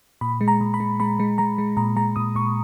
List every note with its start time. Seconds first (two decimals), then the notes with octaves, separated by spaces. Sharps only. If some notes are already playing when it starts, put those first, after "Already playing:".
0.21 A#2 B5
0.41 G#3
0.48 A#5
0.61 A#2
0.74 B5
0.80 G#3
1.00 G#3 B5
1.20 G#3
1.38 G#3 A#5
1.58 G#3
1.77 A#2 A#5
1.96 G#3 A#5
2.16 A#2 D#6
2.35 A#2 C#6